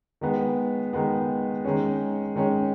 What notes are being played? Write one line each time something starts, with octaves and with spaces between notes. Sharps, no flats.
D#3 G#3 B3
D#3 G#3 B3
D#3 G#3 C#4
D#3 G#3 C#4